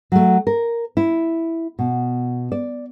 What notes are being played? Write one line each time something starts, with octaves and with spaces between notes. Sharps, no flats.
F#3 A3
A#4
E4
B2
D5